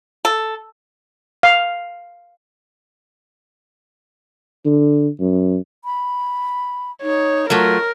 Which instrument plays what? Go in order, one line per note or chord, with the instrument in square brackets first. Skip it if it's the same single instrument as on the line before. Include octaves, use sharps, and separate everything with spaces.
[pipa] A4
[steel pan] F5
[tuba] D3
F#2
[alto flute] B5
[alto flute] D#4 [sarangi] C#5
[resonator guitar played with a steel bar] F#3 A3 [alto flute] F4 [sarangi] A#4